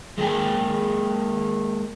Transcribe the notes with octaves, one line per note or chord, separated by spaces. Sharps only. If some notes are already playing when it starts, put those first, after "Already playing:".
G#3 A#3 G#4 A#4 G5 G#5